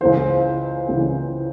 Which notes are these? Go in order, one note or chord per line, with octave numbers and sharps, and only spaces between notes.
C#2 C#3 E3 C5
C#2 C#3 E3